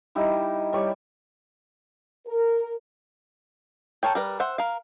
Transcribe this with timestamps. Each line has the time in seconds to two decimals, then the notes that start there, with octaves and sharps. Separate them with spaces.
0.15 G3 D#4 E4
0.73 G3 C#5 D5
2.27 A#4
4.03 A4 A#4 C#5 G5
4.15 G3 A#4 B4
4.40 C5 E5 F#5
4.58 A#4 F5